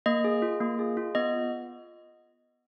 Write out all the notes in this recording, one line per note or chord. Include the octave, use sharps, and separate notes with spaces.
A#3 D#5
G#4
F4
A#3
G#4
F4
B3 D#5